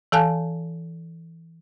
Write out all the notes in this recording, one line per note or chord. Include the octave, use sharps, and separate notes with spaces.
E3 A4 F5 G#5 A5 F#6